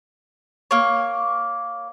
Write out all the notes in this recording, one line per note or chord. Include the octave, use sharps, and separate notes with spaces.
A#3 C#5